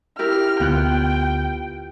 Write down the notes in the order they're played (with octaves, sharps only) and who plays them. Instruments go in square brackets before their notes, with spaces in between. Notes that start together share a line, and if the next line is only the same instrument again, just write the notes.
[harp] E4 G4 A#4 [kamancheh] F6
[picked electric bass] D2 [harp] B3 F4 F#6 [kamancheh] G5